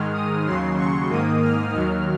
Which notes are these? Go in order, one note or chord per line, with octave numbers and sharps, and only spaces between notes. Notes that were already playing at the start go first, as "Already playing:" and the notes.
Already playing: G#2 D#3 G#3 F6
D#6
D#2 C#3 F#3 C6
C#6
G#2 D#3 A#3 D#6
F6
D#2 D#3 F#3 F6